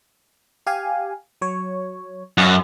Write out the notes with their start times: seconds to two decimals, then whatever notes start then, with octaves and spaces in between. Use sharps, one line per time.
0.67 G4 F5 G#5
1.41 F#3 C#5
2.38 F#2 D#5 F5 F#6